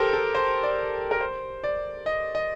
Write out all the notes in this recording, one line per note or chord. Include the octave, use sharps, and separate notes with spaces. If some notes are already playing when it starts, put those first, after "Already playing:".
Already playing: G4 A4 A#4 C5
A4
C5
D5
A#4
C5
D5
D#5
D#5